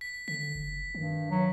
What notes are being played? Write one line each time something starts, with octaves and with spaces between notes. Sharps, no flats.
B6
D3 B6
F#1
G2 D#3
F#3